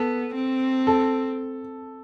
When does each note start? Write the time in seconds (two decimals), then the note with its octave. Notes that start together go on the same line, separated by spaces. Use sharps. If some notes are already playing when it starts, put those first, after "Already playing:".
Already playing: B3 A4
0.35 C4
0.87 A4